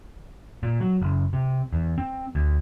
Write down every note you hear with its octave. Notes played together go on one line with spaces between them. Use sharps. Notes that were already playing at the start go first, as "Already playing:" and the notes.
A#2
F#3
F#1
C3
E2
C4
D2